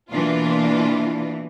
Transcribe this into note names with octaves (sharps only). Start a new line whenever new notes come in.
B2 E3 A#3 D4 F4